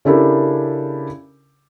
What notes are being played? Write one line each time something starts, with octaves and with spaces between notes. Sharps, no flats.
C#3 D4 E4 G4 A4 A#4